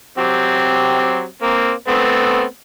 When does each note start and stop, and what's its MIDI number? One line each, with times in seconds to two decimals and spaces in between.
0.18 1.25 54
0.18 1.25 60
0.18 1.25 67
1.42 1.71 58
1.42 1.71 60
1.88 2.42 57
1.88 2.42 59
1.88 2.42 60